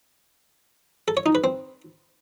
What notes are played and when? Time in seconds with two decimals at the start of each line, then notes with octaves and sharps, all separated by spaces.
1.08 A4
1.17 C#5
1.26 D#4
1.35 B4
1.44 C4